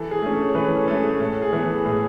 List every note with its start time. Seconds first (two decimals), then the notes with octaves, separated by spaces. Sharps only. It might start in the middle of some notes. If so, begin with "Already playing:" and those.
Already playing: E3 A4
0.11 G#4
0.22 A3 C#4
0.33 A4
0.49 C#5
0.55 E3 B4
0.77 A4
0.87 A3 C#4 A4
0.98 G#4
1.20 A2 A4
1.42 G#4
1.53 E3 B3
1.63 A4
1.85 A2 G#4